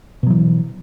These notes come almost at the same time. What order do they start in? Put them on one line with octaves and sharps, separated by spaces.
B2 F#3 E3